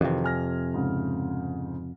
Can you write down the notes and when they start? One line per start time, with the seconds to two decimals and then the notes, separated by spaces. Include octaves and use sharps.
0.01 F2 C3 D#3 E3 F#4
0.24 G#5 F6 A#6
0.74 G#2 C#3